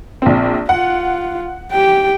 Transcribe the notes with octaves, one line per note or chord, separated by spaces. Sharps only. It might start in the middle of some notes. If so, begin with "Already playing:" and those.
A#1 C4
F4 F#5
G4 G5